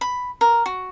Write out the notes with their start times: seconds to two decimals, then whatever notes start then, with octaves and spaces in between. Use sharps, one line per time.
0.01 B5
0.41 A#4
0.66 F#4